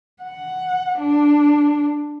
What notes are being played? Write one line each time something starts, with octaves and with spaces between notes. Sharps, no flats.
F#5
D4